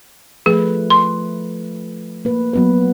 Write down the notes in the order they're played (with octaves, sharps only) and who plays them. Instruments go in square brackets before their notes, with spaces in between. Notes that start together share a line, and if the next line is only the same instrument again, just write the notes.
[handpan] F3 A3 B4 [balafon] G#4
[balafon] C6
[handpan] A#3 B4
F#3 B3 B4